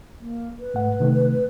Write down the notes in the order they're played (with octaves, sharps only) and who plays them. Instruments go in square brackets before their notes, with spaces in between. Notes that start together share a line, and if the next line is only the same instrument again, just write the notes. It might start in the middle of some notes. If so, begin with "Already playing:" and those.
[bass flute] A#3
B4
[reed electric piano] G#2 A3 F#5
C3 D#3 A3